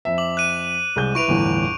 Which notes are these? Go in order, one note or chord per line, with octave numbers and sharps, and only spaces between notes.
F2 E5
D6 F#7
F#6 D#7
C2 G#3 G6
E4 B4 C#6 D7 F7
G1 E2 A2